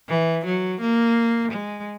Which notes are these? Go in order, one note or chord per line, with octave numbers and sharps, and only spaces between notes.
E3
F#3
A#3
G#3